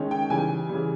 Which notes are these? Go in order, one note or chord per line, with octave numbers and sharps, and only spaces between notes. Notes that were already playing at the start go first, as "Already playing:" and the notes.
Already playing: D#3 G#3 C#4
G5
C#3 E3 G3 G#5
C#3 E3 G3